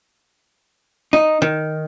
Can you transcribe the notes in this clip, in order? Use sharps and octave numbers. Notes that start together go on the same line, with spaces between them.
D#4
D#3